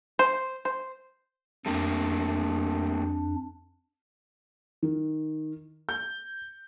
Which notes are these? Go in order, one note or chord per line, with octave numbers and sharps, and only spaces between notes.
C5
C5
F2 G3 A3 A#3 D4
D#3
G6